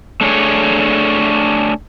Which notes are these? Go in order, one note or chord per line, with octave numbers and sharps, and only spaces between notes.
A3 D4 G#4 C#5